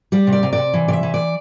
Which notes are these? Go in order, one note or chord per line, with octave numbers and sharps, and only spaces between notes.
G3 D5
C3
D5
C3
D5
C3
E3
C3 D5 E5
E3
D5